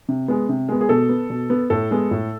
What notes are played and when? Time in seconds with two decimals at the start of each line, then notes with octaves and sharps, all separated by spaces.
0.09 C3
0.28 G#3 B3
0.49 C3
0.69 G#3 B3
0.81 G#4
0.89 B2 A4
1.09 B3
1.30 B2
1.50 B3
1.70 A2 A4
1.91 G#3 B3
2.11 A2